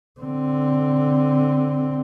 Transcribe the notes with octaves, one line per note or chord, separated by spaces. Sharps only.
D3 C4